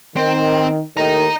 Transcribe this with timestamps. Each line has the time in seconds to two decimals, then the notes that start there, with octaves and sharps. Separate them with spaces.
0.17 D#3 C4
0.97 D#2 A2 D#3 D#5 A#5